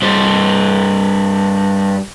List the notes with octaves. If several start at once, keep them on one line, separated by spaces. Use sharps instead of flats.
G2 C5